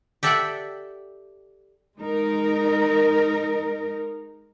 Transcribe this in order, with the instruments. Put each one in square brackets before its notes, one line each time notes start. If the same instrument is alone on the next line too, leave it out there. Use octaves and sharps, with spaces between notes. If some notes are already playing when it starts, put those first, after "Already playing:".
[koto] G4 A4 D5 E5 F#5 G5
[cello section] G#3 D#4 A#4